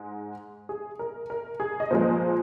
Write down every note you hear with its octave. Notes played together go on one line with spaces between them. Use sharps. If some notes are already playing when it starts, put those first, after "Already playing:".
Already playing: G#2 G#3
G#4
A#4
A#4
G#4
D#5
A#2 F3 G#3 C5